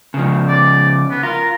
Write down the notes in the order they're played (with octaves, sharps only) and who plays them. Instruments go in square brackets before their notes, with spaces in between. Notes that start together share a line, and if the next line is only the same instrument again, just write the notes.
[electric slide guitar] C#3 F3
[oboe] D5
B3
[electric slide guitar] F4 [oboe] A#4